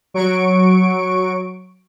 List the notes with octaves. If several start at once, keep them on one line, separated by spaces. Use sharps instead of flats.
F#3 C#6 D7